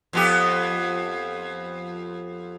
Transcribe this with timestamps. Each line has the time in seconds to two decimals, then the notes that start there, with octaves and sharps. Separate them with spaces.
0.13 F2 B3 G4